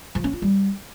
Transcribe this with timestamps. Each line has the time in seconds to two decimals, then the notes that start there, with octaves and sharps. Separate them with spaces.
0.15 F3
0.24 C#4
0.33 F4
0.42 G3